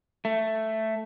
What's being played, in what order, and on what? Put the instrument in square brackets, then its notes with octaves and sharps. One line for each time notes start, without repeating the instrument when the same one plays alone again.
[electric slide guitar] A3